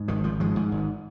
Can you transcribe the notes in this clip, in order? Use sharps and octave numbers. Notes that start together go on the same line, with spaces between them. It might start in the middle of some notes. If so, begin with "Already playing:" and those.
Already playing: G#2
G#1 D#3
G#1 F3
G#2 F3 G#3
G#2
G#1